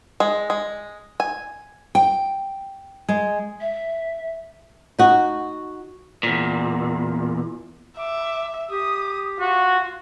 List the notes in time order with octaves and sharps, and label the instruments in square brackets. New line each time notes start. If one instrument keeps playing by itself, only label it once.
[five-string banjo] G#3
G#3
G#5
[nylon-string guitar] G5
G#3
[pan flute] E5
[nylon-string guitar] D#4 F#4
[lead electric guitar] E2 A#2
[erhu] E5 [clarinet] D6
[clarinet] G4 [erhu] D#6
[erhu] F4 [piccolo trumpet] F#4